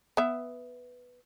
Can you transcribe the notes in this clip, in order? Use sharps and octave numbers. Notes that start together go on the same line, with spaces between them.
B3 E5